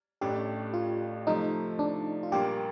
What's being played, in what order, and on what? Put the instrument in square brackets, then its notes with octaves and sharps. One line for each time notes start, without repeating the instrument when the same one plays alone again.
[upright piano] A1 A2 A3 D4 [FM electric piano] G4
[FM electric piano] F4
[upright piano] C3 F3 A3 [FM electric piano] D#4
[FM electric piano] D4
F4
[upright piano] A#1 A#2 G3 A#3 [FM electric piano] G4